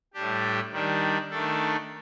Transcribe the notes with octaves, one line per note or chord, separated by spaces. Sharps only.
A2 G3 D4 G4
D#3 G3 D4
D#3 A3 D4 A4